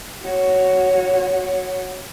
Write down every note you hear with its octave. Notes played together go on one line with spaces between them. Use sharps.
F#4 C#5